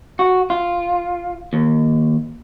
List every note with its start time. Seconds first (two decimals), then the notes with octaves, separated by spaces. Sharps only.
0.19 F#4
0.50 F4
1.53 D#2